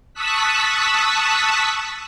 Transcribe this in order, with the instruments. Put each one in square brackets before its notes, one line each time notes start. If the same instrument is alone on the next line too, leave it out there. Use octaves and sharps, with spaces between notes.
[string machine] A5 C#6 D#6 E6 F#6 B6